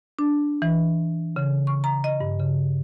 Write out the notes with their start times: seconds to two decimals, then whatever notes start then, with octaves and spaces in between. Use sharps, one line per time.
0.19 D4
0.62 E3
1.36 C#3
1.67 C#6
1.84 A#5
2.04 D#5
2.20 G2
2.39 C#3